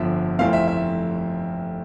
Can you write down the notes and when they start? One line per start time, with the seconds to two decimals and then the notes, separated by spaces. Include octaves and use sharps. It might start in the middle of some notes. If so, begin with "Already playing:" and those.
Already playing: G1 F2 D3 F3 E5
0.39 F1 F2 E3 A3 C4 F5
0.53 E5
0.68 E5